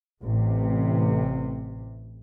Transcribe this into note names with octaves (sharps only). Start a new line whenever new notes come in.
A1 C3